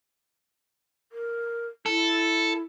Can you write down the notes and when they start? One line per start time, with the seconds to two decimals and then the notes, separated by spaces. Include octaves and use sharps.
1.12 A#4
1.86 E4 A4